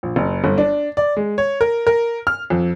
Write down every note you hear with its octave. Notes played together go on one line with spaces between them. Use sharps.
A#1
F#1
G1
D4
D5
G#3
C#5
A#4
A#4
F6
F2